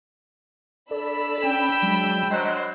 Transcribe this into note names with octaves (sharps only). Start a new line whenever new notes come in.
D4 A4 D5 B5 E6
C#4 G5
F#3 G#3
F#3 C5 D#5 C6 F#6